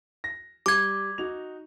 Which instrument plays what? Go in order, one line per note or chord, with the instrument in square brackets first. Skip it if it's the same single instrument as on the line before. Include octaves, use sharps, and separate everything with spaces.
[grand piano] A#6
[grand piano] G3 [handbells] D6 G#6
[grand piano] D#4 F#4 F7